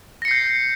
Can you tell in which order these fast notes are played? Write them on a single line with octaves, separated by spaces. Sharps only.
A#6 C#7 C7 G6